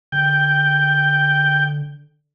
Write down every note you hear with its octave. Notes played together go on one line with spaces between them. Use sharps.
D3 G5